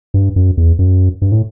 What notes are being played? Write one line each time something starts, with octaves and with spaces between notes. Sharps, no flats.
G2
F#2
E2
F#2
G2
A2